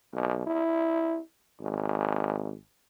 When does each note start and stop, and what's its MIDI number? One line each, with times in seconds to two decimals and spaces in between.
0.14 0.43 35
0.46 1.20 64
1.61 2.55 32